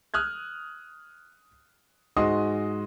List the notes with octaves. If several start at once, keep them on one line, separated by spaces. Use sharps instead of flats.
D#6 F6 F#6 G#6
G#2 G#3 F#4 D#5 C6 D#6